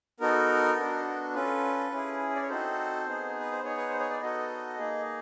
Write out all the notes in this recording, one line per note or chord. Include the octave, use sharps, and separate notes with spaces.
B3 D#4 F#4 A4 A#4
B3 D4 F#4 A4
C#4 F4 A4 B4
C#4 E4 G#4
D5
C#5
C4 D#4 F#4 A4 C5
B3 D#4 G#4
B4
C5
B3 D#4 G#4 C#5
B4
C5
C#5
D5
B3 D#4 F#4 A4 D#5
A#3 D#4 G#4